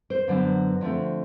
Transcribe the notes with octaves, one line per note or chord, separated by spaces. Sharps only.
C5
F#2 D3 F#3 B3
D3 F3 A3 C4